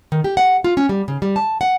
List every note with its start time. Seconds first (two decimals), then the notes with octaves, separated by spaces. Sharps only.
0.12 D#3
0.24 G4
0.37 F#5
0.64 F4
0.77 C#4
0.89 G3
1.08 C#3
1.22 G3
1.36 A5
1.61 F#5